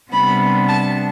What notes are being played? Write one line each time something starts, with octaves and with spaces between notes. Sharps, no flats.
C3 G3 B3 D4 B5
A5